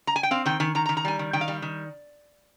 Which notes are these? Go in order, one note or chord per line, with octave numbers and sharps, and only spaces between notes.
A#5
G#5
G5
C4 F5
D#3 G5
D#3 G#5
D#3 A#5
A#5
D#3
A#5
G3 G#5
D#3
D#3 G5
F5
G3
D#3